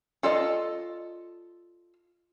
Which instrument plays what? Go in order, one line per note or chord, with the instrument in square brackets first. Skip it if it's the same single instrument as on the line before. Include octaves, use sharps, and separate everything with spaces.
[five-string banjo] F4 A4 D5 D#5